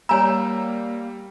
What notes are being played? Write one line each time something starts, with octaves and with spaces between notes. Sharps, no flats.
G3 A#3 C#5 G#5 A#5 E6